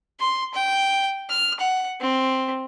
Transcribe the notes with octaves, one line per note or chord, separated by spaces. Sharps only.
C6
G5
F6
F#5
C4